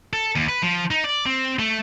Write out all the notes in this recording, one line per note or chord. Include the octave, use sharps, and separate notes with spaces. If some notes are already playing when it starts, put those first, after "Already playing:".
A4
D#2
B4
F3
D#4
D5
C4
A3